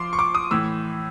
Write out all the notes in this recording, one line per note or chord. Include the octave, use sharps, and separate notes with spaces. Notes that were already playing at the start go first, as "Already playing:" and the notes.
Already playing: F3 C6 D6
C#6
D6
D#6
A2 E3 E6